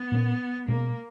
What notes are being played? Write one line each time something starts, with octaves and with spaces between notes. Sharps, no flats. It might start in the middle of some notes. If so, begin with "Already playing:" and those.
Already playing: B3
A#2 A#3 C#4
B2 G#3 A#3 C#4